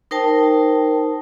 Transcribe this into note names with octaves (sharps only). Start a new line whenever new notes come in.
D#4 A#4 C5 G5 A5